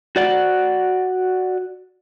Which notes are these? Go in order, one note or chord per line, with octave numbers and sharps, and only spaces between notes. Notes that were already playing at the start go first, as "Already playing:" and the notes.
F#4 D5 F#5